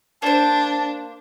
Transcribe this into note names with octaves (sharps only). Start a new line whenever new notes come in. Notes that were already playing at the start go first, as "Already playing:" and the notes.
A#3 D4 C5 A5